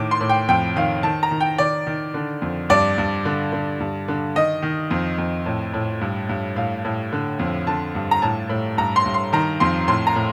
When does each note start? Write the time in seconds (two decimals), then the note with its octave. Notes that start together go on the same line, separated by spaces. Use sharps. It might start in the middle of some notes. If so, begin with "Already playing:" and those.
Already playing: A2 D#3 D6
0.11 C6
0.21 A2
0.29 G5
0.48 F2 G5
0.76 D#3 F5
1.03 D#3 A5
1.23 A#5
1.31 D#3
1.40 G5
1.58 D#3 D5
1.86 D#3
2.14 D3
2.42 F2
2.70 G2 D5
2.98 G2
3.25 D3
3.52 D3
3.80 G2
4.08 D3
4.35 D#3 D#5
4.62 D#3
4.91 F2
5.18 F2
5.46 A2
5.74 A2
6.01 G2
6.29 G2
6.56 A2 F5
6.85 A2
7.12 D3
7.39 F2
7.67 D3 A5
7.95 G2
8.11 A#5
8.22 A2 A5
8.49 A2
8.77 G2 A#5
8.96 C6
9.06 G2
9.14 C6
9.33 D#3 A#5
9.60 F2 C6
9.88 A2 C6
10.07 A#5
10.16 A2